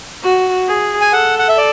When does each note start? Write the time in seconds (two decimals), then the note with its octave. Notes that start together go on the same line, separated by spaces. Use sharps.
0.23 F#4
0.67 G#4
1.01 G#5
1.12 A4 F#5
1.39 F#5
1.48 E5
1.57 D5